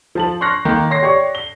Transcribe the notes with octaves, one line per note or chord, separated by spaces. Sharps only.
F3 A5 F#7
C6 C#6 F6 F#6 A#6 C7
D#3 A#3
C#5 C6 A#6 C7
G4 C#5 D5 C#6
G7